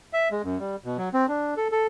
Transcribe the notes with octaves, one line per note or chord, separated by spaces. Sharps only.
E5
G#3
F#2
G3
B2
F#3
C4
D4
A4
A4